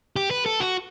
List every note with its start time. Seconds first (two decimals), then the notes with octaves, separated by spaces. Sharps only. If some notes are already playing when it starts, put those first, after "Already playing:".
0.16 G4
0.31 B4
0.46 A4
0.60 F#4